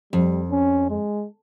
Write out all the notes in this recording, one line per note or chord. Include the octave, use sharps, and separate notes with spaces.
F2 G3
C#4
G#3